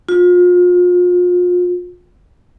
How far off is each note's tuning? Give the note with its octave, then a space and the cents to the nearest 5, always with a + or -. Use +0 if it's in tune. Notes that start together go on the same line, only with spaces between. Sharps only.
F4 +35